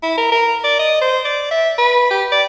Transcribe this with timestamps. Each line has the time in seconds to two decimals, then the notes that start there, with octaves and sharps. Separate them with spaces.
0.03 E4
0.18 A#4
0.32 A#4
0.64 D5
0.79 D#5
1.01 C5
1.25 D5
1.51 E5
1.79 B4
2.11 G4
2.32 D5